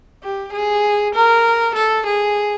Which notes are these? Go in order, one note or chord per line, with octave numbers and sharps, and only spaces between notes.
G4
G#4
A#4
A4
G#4